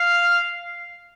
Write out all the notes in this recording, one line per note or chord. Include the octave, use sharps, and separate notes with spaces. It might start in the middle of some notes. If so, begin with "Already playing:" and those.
Already playing: F5